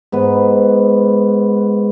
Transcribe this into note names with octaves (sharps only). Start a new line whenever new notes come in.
G#2 B3 B4